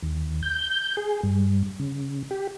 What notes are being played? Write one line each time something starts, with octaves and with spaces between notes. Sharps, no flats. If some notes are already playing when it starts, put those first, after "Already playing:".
D#2
G6
G#4
G2
C#3
G4